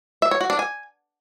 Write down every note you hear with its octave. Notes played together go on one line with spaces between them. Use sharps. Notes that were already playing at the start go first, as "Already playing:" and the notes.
E5
C#5
F#4
D4
G#5